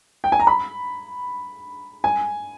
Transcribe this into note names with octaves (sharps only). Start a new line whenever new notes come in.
G5
G#5
A#5
B5
G#5